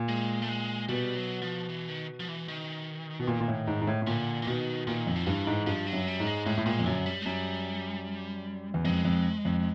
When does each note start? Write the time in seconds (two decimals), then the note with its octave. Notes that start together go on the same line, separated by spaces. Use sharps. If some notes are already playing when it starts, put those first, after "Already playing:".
Already playing: A#2
0.09 G#3
0.42 A3
0.49 G#3
0.89 B2 G3
1.16 F#3
1.42 F3
1.68 E3
1.89 D#3
2.20 F3
2.28 E3
2.48 D#3
3.19 B2
3.27 A#2
3.40 A#2
3.48 A2
3.67 G#2
3.81 G#2
3.87 A2
4.02 A2
4.07 A#2 D3
4.42 E3
4.47 B2 D#3
4.87 A#2 D#3
5.07 F2
5.16 F3
5.26 G2 E3
5.47 G#2
5.66 G2 F3
5.87 F#3
5.93 F#2
6.07 G3
6.20 G#2
6.26 G#3
6.46 A2 G#3
6.57 A2
6.66 A#2 G#3
6.79 F2
6.86 F#2 D3
7.06 G3
7.22 G#3
7.26 F#2 G3
8.74 E2
8.85 F2 G#3
9.05 F2
9.45 F2